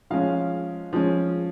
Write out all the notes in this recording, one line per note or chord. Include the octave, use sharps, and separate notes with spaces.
F3 G#3 C#4 F5
F3 G#3 C#4